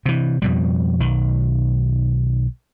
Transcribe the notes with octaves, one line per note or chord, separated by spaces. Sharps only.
C3 E3
F2 B2 G3
B1 D#3